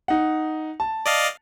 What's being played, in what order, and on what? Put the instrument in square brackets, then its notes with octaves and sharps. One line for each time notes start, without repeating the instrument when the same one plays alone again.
[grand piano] D#4 F#5
A5
[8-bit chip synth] D5 D#5 F5